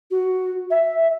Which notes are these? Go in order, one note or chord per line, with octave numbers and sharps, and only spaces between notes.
F#4
E5